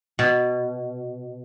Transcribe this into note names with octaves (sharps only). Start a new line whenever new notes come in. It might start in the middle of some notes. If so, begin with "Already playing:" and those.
B2